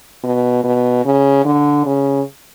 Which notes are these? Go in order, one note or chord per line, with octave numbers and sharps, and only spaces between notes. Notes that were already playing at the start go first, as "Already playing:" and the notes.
B2
B2
C#3
D3
C#3